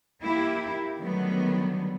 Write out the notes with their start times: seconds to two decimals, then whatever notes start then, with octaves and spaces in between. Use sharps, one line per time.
0.21 A#3 E4 G4
0.98 D3 D#3 F#3 G3 A3 B3